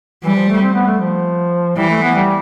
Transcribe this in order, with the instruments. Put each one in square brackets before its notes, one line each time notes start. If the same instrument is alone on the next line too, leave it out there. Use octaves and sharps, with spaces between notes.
[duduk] E3 [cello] G3
[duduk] F3
A3
C4
B3
A3
F3
[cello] E3 [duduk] G3
[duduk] A3
B3
G3